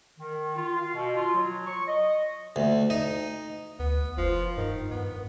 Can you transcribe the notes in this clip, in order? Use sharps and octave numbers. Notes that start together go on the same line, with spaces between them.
D#3
F4
F5
B2
F4
F#3
C#6
D#5
D2
D#4
D2 B3
F1 F3
G2 D#3
G2 B3